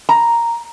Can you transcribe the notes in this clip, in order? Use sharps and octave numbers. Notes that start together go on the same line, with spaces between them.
A#5